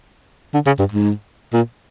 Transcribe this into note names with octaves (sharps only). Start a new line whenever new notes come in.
D3
C#3
G2
G#2
A#2